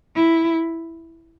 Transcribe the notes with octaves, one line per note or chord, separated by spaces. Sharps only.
E4